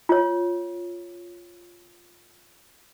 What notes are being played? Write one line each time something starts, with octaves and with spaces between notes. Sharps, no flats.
F4 C#5